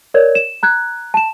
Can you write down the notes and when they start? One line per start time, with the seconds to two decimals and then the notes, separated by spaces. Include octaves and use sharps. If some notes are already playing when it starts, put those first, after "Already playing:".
0.14 A#4 C#5 D5 G#6
0.35 E7
0.63 A#5 F#6 G#6
1.14 A5 E7